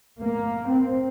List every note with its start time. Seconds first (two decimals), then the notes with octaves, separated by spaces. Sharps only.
0.23 A#3
0.69 C4